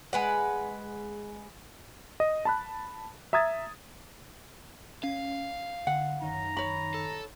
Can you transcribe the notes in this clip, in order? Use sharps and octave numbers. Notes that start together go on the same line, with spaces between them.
G#3 B4 F#5
D#5
A5 B5 F#6
E5 A#5 D#6 G#6 A6
C#4 F5
D3 F#5
F#2 D#3 D#4 A#5
C#5 B5
A4